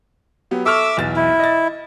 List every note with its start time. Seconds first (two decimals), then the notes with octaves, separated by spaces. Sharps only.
0.51 F#3 B3 G4
0.66 A4 E5 C#6 D6 E6 F6
0.97 B1 E2 A6
1.16 E4
1.40 D#5 A6